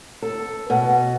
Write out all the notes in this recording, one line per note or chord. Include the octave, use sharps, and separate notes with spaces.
A4
B2